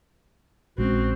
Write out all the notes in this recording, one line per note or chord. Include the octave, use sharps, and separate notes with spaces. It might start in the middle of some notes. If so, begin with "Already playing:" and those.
A#1 G#3 C4 C#4 F#4